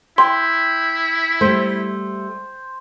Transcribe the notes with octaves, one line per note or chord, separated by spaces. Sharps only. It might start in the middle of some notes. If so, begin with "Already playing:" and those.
E4 G5 C6
G3 A3 C5